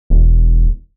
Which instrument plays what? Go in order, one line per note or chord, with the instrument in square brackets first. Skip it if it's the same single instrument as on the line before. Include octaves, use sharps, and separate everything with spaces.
[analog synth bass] E1